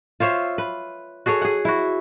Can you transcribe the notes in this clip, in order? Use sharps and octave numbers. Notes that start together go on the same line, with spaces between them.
F4 C5 C#5 E5
B4
F#4 G#4 A4 C#5
G#4 F#5
E4 F#4